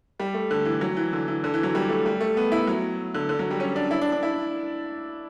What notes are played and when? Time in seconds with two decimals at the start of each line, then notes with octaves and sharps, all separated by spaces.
0.20 G3
0.34 A3
0.51 D3
0.65 E3
0.81 F#3
0.97 E3
1.13 D3
1.28 E3
1.44 D3
1.54 E3
1.63 F#3
1.75 G3
1.89 A3
2.06 G3
2.21 A3
2.37 B3
2.52 E4
2.67 F#3
3.14 D3
3.29 D3
3.39 F#3
3.51 G3
3.60 C#4
3.76 D4
3.91 E4
4.01 D4
4.12 D4
4.23 E4